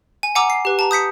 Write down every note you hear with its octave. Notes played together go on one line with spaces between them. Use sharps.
G#5
F#5 G#5 A#5 D6 E6
C7
G4 B4
A5 A#5
D#6 G6 B6 C#7